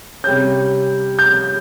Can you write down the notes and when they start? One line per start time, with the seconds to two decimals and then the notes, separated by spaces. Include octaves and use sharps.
0.24 C3 G3 C#4 G6
1.19 G6